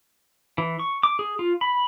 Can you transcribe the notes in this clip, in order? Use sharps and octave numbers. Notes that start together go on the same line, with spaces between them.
E3
C#6
D6
G#4
F4
B5